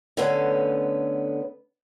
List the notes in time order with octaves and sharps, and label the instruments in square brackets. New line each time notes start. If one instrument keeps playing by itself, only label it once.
[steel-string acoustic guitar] D3 A3 B3 C#4